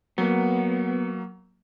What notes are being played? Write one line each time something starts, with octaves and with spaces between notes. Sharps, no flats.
F#3 A#3 B3